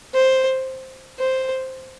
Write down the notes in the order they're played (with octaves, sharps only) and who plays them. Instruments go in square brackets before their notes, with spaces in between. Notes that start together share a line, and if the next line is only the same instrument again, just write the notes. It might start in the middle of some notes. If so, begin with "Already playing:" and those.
[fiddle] C5
C5